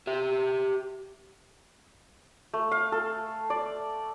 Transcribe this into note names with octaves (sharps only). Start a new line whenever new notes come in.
G4 E5
A3
F5
A4
D5